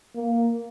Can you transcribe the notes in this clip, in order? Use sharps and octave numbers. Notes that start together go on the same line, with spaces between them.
A#3